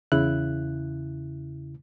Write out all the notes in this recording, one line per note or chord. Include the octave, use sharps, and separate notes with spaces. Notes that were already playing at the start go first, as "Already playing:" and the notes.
E2 C#3 E4 F#6